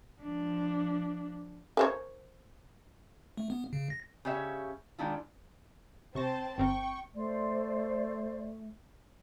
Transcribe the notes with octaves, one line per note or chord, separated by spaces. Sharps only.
F3 D4
A#4 C5 C#5
A3
B3
C#3
A#6
C#3 G4 C#5 E5
D#3 G#3 D4 E4 F4
C3 C4 C5 A5 C#6 A#6
G1 C4 A#4 G5 C#6
A3 C5 D5